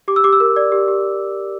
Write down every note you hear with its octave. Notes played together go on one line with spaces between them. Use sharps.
G4 D6
E6
G4 D6
E6
A#4
D5
G4
G4